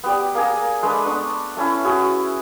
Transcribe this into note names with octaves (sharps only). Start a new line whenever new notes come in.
B3 G4 D5
A#3 G#4 G#5 A#5
G#3 A3 D4 B4
B3 D4 C#6
A3 C#4 E4
E4 F#4 G#4